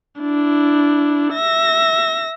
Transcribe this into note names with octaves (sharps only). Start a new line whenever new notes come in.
D4 E4
E5 A#6